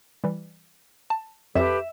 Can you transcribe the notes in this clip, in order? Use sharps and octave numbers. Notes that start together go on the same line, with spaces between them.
E3 G3
A5
F2 G4 A4 B4 E5